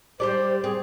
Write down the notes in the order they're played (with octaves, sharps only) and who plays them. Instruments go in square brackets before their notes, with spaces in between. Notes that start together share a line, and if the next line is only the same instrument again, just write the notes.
[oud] G3 G4 D5 [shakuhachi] C5
[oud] C4 [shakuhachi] G#4